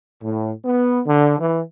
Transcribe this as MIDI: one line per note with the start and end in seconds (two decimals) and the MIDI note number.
0.23 0.50 45
0.64 1.01 59
1.06 1.38 50
1.39 1.60 52